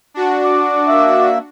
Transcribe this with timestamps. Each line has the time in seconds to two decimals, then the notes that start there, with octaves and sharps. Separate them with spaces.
0.14 D4 F#4
0.44 D6
0.87 A#3 E5